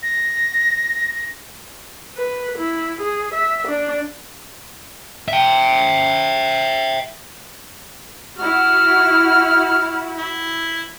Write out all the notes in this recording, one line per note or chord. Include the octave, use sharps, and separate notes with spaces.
A#6
B4
E4
G#4
E5
D4
E5 G5
E4 F#4 F6
E4